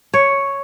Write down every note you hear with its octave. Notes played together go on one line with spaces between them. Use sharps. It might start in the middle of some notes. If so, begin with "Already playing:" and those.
C#5